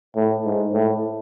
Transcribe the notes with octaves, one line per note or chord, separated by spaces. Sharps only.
A2
G#2
A2